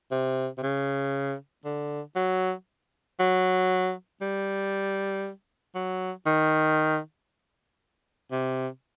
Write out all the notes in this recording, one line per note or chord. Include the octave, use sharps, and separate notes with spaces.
C3
C3
C#3
D3
F#3
F#3
G3
F#3
D#3
C3